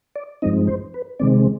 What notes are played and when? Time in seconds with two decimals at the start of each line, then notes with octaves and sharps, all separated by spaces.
0.16 D5
0.42 G2 F3 G#3 C4 D#4 D#5
0.68 C5
0.94 B4
1.19 C3 D#3 G#3 C4 D5